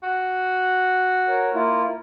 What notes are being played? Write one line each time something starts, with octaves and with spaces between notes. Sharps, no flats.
F#4
A#4 C#5
A#3 E4 F4